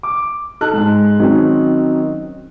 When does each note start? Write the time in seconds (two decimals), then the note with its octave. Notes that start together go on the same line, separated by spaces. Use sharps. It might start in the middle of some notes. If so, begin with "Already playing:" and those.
0.03 D6
0.61 D#4 A4 A5 F#6
0.73 G#2 G#3
1.19 D#3 F#3 C4 C#4 D#4